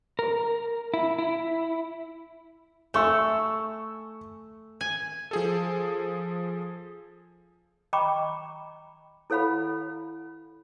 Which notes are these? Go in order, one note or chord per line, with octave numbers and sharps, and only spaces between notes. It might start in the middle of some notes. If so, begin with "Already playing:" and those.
A#4
E4
E4
A3 G#5 C#6 E6
G#5
F3 G#4 A4
D#5 G5 A#5 B5 C#6 D6
E4 A4 C#5 F5 F#5 B5